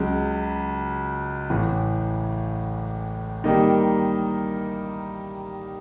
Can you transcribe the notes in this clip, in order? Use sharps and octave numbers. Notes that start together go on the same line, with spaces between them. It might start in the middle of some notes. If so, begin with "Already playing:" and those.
Already playing: C#2 C#3 F#3
A1 A2 E3
D#3 G3 A#3 D#4